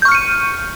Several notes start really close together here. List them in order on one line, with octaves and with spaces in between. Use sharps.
G6 C#6 F6 C#7 D#7